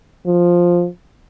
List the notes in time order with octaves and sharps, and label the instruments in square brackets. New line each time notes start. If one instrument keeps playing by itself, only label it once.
[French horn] F3